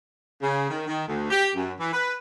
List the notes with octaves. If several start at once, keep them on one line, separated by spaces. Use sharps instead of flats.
C#3
D#3
D#3
D2
G4
F#2
E3
B4